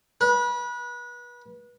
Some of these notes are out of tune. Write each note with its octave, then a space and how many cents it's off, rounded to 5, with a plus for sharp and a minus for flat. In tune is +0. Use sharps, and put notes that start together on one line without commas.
B4 -30